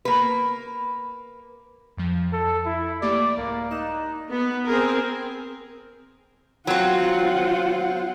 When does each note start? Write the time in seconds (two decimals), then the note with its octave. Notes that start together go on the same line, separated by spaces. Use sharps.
0.05 A#3 B4
1.97 F2 F3
2.33 A4
2.66 E4
3.02 A3 A#3 G4 D5
3.37 C2 G#2 A#3
3.71 D#4 F#6 E7
4.30 B3
4.67 C4 G#4 A#4
6.67 F#3 C4 F4 F#5